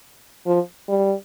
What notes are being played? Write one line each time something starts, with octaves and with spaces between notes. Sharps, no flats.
F3
G3